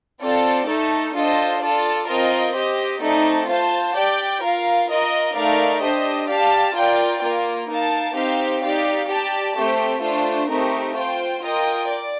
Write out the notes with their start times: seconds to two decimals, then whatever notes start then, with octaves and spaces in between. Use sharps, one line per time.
0.22 C4 F4 A4 D5
0.67 A3 D#4 A4
1.14 D4 F4 A4 C5 D#5
1.62 F4 A4 D5 A5
2.08 C4 F4 A#4 D#5
2.54 G4 C5 D#5
3.02 A3 C4 D#4 A4 D5
3.48 F4 C5 F5 A5
3.95 G4 D5 G5
4.42 F4 A#4 F5
4.89 F4 A#4 D#5
5.34 A3 D#4 A#4 D5 F5
5.82 D4 G4 C5 D#5
6.29 G4 D5 F5 A5
6.75 F4 A#4 D5 G5
7.22 A#3 F4 A#4
7.69 D#4 A#4 F5 A5
8.15 C4 D#4 G4 C5 F5
8.62 D#4 G4 D5 F5
9.08 G4 D5 A5
9.56 A3 C4 G4 C5
10.02 A3 D4 F4 C5
10.49 A3 C4 D#4 G4 A#4
10.96 F4 C5 G5
11.42 F4 A#4 D#5 G5
11.89 D5